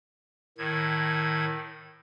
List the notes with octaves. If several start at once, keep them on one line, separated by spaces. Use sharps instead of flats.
A2 D#3 G#6